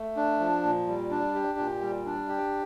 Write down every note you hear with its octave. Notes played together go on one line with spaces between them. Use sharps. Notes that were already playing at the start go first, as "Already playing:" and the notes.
Already playing: A3
D4
F3
A#2
G3
D4
G4
A#2
G3
D4
G4